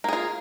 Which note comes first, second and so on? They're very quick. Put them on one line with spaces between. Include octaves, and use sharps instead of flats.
A#3 G#4 F4